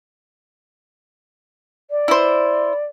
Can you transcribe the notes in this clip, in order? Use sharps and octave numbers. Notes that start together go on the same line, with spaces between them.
D5
E4 C5